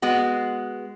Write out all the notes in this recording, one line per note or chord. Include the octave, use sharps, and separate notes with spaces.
G#3 B3 F#4